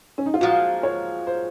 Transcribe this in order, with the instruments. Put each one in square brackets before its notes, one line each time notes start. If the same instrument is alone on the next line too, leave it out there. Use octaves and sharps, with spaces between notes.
[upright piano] C#4
D#4
F4
[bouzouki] A#2 F3 G#3 [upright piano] F#4
[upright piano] C#5
C5